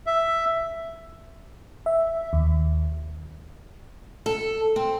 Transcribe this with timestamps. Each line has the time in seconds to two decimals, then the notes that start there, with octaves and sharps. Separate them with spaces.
0.07 E5
1.86 E5
2.33 D#2
4.26 A4
4.76 C4